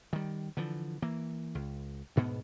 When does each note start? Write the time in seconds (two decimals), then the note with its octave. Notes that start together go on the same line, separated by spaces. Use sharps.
0.13 D#3 G3
0.57 D3 E3 F3
1.02 E3 A#3
1.55 C#2
2.16 D2 G#2 B2 B3